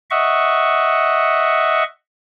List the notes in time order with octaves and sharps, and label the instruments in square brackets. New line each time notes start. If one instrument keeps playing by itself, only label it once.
[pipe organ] D#5 E5 F#5 C#6